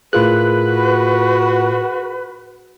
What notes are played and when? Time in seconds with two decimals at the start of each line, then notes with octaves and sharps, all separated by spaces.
0.13 A2 F4 G#4 A#4 B4 F#6
0.71 F#4